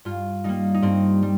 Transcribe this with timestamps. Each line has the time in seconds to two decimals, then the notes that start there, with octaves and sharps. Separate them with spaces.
0.05 G2 F4
0.44 G3 A#3 D#4
0.74 D#4
0.82 G2 C4
1.23 G3